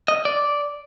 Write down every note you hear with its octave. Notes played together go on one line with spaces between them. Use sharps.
D#5
D5